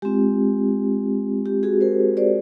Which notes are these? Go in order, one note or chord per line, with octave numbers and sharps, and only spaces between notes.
G#3 C4 F4 G4
G4
F#4 G#4
A#4 C5
C5 D5